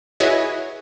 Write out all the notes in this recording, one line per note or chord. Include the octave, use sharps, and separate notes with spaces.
E4 F#4 G#4 B4 C#5 D#5